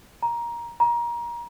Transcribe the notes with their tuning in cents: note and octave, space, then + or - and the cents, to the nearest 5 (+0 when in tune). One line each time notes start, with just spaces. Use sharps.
A#5 +15
A#5 +25